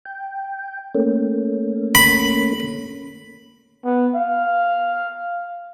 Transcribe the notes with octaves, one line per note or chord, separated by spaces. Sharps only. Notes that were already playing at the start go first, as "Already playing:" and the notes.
G5
A3 A#3 C#4
B5
B3
F5